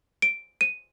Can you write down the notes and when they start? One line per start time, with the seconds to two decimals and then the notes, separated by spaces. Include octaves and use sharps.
0.22 D7
0.61 D#7